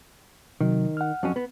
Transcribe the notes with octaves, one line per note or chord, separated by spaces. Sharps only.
C3 D#3 F#3
F#5 F6
F2 F#3 C#4
B3